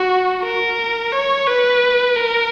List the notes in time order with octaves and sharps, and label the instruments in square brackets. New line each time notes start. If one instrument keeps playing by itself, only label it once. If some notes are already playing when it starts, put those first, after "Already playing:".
Already playing: [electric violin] F#4
A#4
C#5
B4
A#4